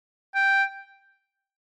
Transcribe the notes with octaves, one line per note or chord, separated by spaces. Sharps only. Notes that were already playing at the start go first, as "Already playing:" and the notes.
G5